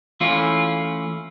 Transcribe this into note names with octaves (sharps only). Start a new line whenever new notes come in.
E3 A3 C#4 E4 F4